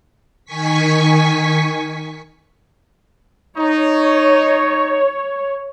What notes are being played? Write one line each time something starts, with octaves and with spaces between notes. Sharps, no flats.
D#3 G#5 C#6 B6
D#4 C#5